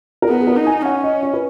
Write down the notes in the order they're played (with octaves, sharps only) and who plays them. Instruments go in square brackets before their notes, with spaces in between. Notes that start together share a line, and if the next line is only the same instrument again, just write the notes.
[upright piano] A#4
[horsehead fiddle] B3 [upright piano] G#4
[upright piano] G#4
A#4
[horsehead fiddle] D#4
[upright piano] G#5
[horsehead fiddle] C#4 [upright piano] F#5
[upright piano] D#5
C#5
B4